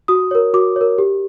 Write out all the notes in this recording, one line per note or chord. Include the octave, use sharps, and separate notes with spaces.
F#4 D#6
A#4 C#5
F#4 D6
A#4 C#5
G4